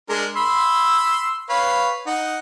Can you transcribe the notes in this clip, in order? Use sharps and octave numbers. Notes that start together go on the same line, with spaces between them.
G#3 D4 A#4
B5 C6 E6
B4 C#5 F5
D#4 F#5